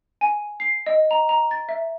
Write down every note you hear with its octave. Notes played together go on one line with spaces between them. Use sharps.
G#5
C7
D#5
A#5
A#5
A6
E5